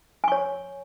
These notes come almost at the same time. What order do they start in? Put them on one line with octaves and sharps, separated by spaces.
G#5 C#6 C#5